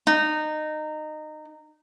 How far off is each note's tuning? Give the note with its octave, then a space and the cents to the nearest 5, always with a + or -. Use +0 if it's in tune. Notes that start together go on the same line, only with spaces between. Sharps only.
D#4 -20